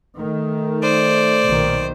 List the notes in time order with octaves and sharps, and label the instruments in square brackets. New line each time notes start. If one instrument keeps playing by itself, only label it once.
[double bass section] D#3 [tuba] A3
[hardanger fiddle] C5 [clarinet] D5
[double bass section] B1 A#2 D#3